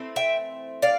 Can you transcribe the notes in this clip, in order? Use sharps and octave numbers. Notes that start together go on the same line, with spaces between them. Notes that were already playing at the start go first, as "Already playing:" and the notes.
Already playing: E3 A3 C4
E5 G5
D5 F5